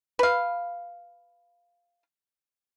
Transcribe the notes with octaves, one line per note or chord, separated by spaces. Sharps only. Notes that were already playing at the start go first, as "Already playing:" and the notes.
B4 F5